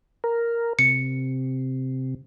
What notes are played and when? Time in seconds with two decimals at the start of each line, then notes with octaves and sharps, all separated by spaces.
0.24 A#4
0.79 C3 C#7